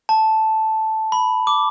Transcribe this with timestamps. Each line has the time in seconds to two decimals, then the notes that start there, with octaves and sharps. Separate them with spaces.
0.09 A5
1.12 B5
1.47 D6